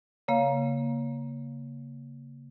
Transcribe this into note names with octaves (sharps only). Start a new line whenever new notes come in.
C#3 A#3 F5